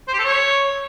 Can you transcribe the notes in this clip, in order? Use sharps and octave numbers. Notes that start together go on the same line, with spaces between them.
C5
G4
A4
C#5